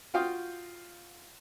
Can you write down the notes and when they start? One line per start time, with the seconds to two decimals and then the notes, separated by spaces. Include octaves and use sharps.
0.14 F4 F#4 F5 G5 D#6